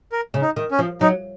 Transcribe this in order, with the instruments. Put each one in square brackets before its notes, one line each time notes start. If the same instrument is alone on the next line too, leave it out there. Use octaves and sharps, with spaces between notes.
[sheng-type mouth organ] A#4
[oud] C#3
[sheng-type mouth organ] D#4
[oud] D#3
[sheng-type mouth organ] C#4
[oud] F3
[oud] F#3 [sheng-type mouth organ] D#4